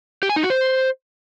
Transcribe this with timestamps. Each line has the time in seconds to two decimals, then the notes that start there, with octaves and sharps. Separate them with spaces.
0.23 G4
0.29 G#5
0.36 D#4
0.43 F#4
0.50 C5